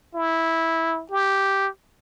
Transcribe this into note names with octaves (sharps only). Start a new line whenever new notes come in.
E4
G4